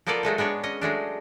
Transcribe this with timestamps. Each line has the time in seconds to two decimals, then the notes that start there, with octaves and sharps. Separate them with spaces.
0.06 F3 A#3 B3 F4 A4 D5
0.23 F#3 G#3 A3 D#4
0.38 G#3 B3 D4 C#5
0.63 C#4 D#5
0.81 F#3 G#3 A3 D4